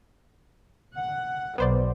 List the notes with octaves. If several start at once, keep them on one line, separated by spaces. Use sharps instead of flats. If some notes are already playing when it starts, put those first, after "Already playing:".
F#5
B1 B3 C5 D5